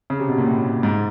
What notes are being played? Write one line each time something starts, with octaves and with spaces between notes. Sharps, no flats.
C#3
C3
B2
A#2
A2
G#2